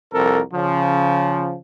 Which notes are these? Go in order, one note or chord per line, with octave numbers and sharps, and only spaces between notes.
C2 F2 A4 A#4
C#3 F3